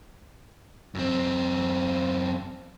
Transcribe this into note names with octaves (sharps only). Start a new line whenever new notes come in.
F#2 C4